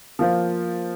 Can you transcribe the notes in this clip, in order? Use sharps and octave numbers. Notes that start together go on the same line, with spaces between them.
F3 A#3 F4 C5